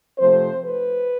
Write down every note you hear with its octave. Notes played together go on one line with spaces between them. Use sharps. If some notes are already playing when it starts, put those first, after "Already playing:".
C3 F3 A3 C4 C5
B4